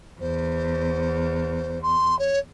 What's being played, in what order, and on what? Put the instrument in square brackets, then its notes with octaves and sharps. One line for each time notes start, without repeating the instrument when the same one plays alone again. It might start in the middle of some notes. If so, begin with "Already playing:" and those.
[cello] E2 [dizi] C5
[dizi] C6
C#5